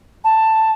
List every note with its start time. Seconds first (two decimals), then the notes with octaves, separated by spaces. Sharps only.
0.24 A5